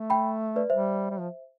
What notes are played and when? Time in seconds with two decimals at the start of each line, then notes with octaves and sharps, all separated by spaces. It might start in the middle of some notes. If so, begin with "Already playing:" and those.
Already playing: A3
0.10 G5 B5
0.56 B4 D5
0.70 G3 C5 E5
1.10 G3
1.19 F3